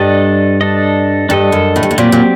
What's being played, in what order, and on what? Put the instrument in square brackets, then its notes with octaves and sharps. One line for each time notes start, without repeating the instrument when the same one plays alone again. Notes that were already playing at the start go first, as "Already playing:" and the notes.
Already playing: [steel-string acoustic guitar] G2 [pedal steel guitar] D4 A4 D#5
[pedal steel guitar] D4 A4 D#5
[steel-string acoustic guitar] G2 [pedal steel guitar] D4 A4 D#5
[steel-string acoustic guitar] F#2
A2
G2
A2
[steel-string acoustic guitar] A#2 [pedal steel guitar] F#3 C4 G4 D5
[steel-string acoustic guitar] A#2